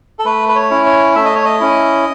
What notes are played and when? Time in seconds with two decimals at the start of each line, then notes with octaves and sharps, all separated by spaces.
0.19 A4
0.25 A3 B4
0.48 B4
0.56 C#5
0.70 C#4 E4
0.86 C#5
1.15 A3 E5
1.25 D#5
1.35 C#5
1.45 D#5
1.60 C#4 E4